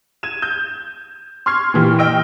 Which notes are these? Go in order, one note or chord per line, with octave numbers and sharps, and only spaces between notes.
G#6 D#7 E7
G6
C6 C#6 F6 G#6 C7
A#2 E3 G4
D#5 G5 E6 F6 A#6 D7